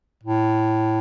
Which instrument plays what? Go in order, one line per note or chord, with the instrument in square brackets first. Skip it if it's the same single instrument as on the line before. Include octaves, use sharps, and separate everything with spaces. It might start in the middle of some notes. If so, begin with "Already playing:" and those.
[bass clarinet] A2